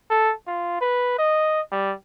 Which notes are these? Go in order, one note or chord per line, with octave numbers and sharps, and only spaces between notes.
A4
F4
B4
D#5
G3